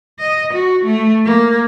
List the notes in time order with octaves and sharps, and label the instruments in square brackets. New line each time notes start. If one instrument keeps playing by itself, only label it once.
[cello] D#5
F#4
A3
A#3